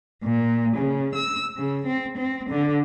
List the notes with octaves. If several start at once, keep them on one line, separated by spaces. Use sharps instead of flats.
A#2
C#3
E6
C#3
C4
C4
D3